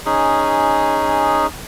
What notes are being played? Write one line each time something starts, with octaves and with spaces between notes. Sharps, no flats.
C#4 D#4 G#4